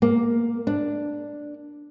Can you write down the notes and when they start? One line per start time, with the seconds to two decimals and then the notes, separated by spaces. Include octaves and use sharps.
0.02 A#3
0.67 D4